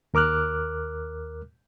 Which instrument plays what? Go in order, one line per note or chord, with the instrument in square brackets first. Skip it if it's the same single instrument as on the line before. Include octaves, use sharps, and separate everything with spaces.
[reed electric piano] D#2 A#4 D6 F6 F#6